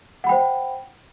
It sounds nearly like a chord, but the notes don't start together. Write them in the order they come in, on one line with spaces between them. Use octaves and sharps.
F#5 B5 G5 C5